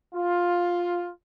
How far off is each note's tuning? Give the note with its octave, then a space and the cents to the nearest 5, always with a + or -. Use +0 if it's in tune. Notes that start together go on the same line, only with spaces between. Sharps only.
F4 +10